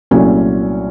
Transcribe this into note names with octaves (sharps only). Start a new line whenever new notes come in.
C2 A#2 F#3 A3 C#4